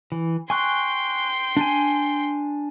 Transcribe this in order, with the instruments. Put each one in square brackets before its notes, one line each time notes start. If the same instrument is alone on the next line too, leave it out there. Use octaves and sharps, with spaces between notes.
[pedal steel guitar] E3
[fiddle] G5 C6 [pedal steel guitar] G#5 C#6 F#6
[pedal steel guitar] D4 G#5